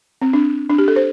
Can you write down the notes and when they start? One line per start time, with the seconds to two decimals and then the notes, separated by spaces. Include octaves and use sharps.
0.22 C4
0.33 D4
0.70 D4
0.78 G4
0.88 A4
0.96 C5